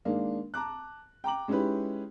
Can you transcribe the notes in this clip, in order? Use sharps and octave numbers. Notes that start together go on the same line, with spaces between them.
D#3 G#3 A#3 D4
A5 A#5 D6 F#6
G5 A#5 D6 F#7
G#3 C#4 D#4 E4 G4 B4